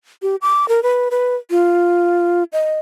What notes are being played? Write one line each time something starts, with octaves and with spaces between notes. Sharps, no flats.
G4
D6
A#4
B4
B4
F4
D#5